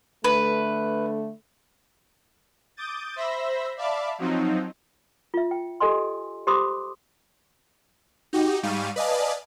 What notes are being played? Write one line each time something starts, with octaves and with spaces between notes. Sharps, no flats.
D3 A3 B4
D6 D#6 G6 A6
C5 E5 B5 E6 A#6
D5 E5 F5 A5 B5 D6
F3 F#3 C4 D#4
F4 E5
G5
G4 A4 D#5 G#5 C6
G4 C5 B5 C6 D6 D#6
D#4 F#4 G4
G#2 G3 F5 C#6 D#7
B4 D5 D#5 F5 G#5 A5